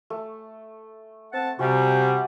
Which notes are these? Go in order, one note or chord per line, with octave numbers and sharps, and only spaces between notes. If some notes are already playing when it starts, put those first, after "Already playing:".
A3
C4 F#5 A5
C3 G3 F#4 G#5